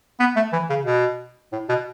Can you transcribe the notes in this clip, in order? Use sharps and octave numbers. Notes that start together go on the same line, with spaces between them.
B3
A3
E3
C#3
B2
A2
B2